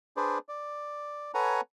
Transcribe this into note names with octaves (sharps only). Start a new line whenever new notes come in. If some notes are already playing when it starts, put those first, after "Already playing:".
D4 G#4 B4 C5 D5
D5
A4 B4 C#5 F#5 G#5 A#5